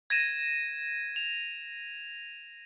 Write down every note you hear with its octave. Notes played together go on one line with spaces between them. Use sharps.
G#6 A#6 D#7 E7
F7